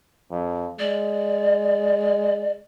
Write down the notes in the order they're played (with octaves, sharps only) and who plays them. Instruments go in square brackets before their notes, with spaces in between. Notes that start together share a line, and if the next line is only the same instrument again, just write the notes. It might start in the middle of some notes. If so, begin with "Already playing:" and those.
[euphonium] F2
[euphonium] G#3 [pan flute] D5